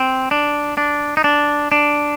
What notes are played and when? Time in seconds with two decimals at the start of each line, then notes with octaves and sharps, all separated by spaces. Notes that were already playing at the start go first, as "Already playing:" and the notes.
Already playing: C4
0.31 D4
0.78 D4
1.17 D#4
1.24 D4
1.72 D4